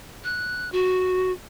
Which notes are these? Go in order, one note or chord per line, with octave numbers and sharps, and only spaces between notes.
F#6
F#4